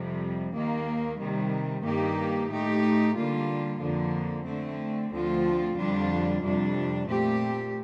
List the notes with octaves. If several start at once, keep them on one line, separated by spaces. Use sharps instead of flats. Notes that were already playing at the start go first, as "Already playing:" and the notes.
Already playing: F2 C3 G3
D#2 D#3 A#3
C3 D#3 G3
G2 D#3 A#3 D#4 G4
A2 A3 D#4 G4
D3 G3 A#3 F4
F2 D3 F3 A#3
D3 A3 C4
D2 D3 F3 C4 F4
F2 D3 G3 D4 F4
F2 C3 G3 D4
A#2 A3 C4 G4